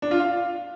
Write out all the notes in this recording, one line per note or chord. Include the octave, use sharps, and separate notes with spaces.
D4
F4
F5